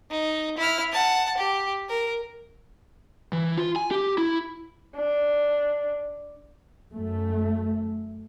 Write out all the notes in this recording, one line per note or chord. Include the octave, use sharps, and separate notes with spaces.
D#4
E4 F6
F#5 A5
G4
A#4
E3
F4
G#5
G4
E4
D4
F#2 A3